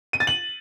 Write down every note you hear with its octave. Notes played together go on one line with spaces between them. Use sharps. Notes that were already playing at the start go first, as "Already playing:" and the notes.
D#7
A6
F#7